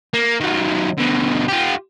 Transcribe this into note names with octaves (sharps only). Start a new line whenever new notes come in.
A#3
D#3 F#3
B2 D3
F4 G4